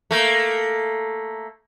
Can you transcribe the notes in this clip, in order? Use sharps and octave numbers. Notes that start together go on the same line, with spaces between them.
A3 A#3